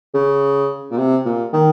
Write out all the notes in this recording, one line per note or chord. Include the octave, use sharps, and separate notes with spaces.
C#3
A#2
C3
A#2
D#3